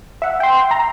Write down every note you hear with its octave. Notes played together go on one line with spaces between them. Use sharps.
E5 F#5
G5 C6
A#5